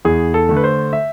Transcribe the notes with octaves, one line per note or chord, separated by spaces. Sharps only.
E2 G#4
A4
D3 A3
B4
C5
E5